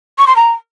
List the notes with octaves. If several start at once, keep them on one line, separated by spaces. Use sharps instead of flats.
C#6
C6
A#5